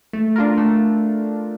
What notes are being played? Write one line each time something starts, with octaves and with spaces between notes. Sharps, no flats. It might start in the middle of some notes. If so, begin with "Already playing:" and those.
A3
D4 F4 A#4
A3